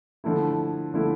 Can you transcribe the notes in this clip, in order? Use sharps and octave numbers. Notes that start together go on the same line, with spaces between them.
D3 F3 A3 E4
D3 F3 A3 E4